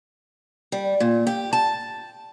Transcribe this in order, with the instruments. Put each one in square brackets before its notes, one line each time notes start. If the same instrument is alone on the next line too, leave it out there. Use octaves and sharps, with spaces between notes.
[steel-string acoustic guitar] G3
A#2
G4
A5